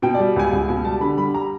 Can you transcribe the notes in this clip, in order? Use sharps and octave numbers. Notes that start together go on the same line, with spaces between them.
B2 G5
D5
G3
C#2 G#5
C#2 G#5
B2 G#5
G3 A5
D3 B5
G3 B5
A#5